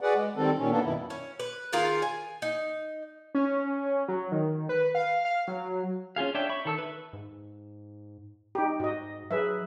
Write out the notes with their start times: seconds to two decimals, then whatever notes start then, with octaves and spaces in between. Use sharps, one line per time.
0.01 F#4 G#4 B4 D5 F#5
0.15 G#3
0.37 D#3 G3 C4 A4
0.58 A#2 D#3 C#4
0.71 A#3 B3 D4 A4
0.84 F#2 B2 D#3 E4
1.10 C#4
1.40 B4
1.73 D#3 F4 G#4 A#4
2.02 G#5
2.42 D#4
3.35 C#4
3.86 C#4
4.08 F#3
4.32 D#3
4.69 B4
4.95 F5
5.25 F5
5.48 F#3
6.16 C#4 F4 G#4 F5
6.35 D4 C#5 E5 G5
6.49 E5 B5 C#6
6.65 D#3 A4 E6
6.78 B4 E5
7.13 G#2
8.55 D#4 G4
8.80 G#2 F#4 D#5
9.31 F#3 G#4 B4 E5